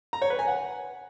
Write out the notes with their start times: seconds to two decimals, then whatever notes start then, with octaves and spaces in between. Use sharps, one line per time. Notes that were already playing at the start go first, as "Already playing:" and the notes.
0.13 A#5
0.22 C#5
0.30 B4
0.39 G#5
0.47 F#5